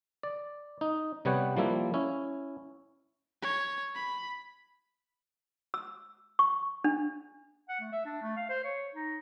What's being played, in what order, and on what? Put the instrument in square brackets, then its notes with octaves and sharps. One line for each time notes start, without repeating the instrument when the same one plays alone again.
[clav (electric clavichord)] D5
D#4
C3 G3 B3 C#5 F#5 G5
F3 G3 A#3 E4
C#4 E4
[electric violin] C#5
B5
[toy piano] E6
C#6
D4
[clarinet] F#5
A3
E5
D4
A3
F5
C5
C#5
D#4